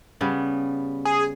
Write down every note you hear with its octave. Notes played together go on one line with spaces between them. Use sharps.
C#3 G3 B3
G#4